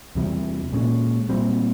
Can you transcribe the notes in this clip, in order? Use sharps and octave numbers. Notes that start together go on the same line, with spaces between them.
E2 C3 G3
A#2 G#3 C#4
A#2 G3 C4